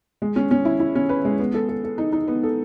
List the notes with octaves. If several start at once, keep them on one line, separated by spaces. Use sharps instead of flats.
G#3
C#4
C#4
E4
E4
C#4
B4
G#3
B3
A4
A4
A4
D#4
D#4
B3
A4